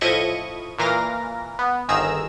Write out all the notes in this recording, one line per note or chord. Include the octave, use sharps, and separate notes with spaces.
A2 F3 E4 D#5 C#6 D#7
A#2 E3 A#4 F5 A#6
B3
G1 D#3 G#4 A#5 E6